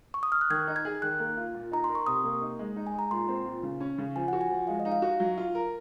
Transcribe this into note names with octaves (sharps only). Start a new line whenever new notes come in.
C#6
D#6
F6
F#6
D#3 G#6
D#4
G#6
G#4
D#3 F#6
A#3
F4
A#2
D#4 A#5
C6
A#4
C#6
C3 D#6
A#3
D#4
G#3
D#4
G#5
G#3 A#5
A#2 C6
C4
A#2
C#3
C#4
C#3
F3 G#5
F#4 F#5
G#5
F3
G#3 F5
D#5
D#4
F5
F#4
F#3
F4
A#4